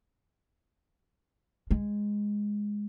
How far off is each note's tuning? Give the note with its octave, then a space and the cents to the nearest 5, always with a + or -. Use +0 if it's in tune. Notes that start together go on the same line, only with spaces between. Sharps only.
G#3 -5